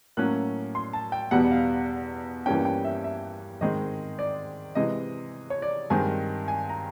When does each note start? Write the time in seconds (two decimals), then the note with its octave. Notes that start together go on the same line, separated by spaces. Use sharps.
0.17 A2 F#3 A#3 C#4 F#6
0.75 C6
0.93 A5
1.12 G5
1.31 E2 B2 G3 B3 F#5
1.51 F5
2.46 G2 E3 G3 A#3 C#4 G5
2.65 G5
2.85 E5
3.04 E5
3.61 G#2 D#3 G#3 C4 D#5
4.19 D5
4.75 C3 E3 G#3 D#5
5.50 C#5
5.62 D5
5.90 G2 D#3 G#3 C4 G#5
6.48 G#5
6.69 A#5